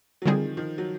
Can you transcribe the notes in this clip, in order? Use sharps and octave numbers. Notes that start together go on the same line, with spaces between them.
F#3
D3 D#3 F3 G3 C4 D#4 G#4
D#3 F3
F#3